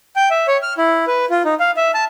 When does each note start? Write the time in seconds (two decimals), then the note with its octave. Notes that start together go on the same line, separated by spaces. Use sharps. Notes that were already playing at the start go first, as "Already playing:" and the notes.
0.16 G5
0.31 E5
0.48 C#5
0.63 F6
0.78 E4
1.07 B4
1.30 F4
1.45 D#4
1.60 F5
1.77 E5
1.94 A5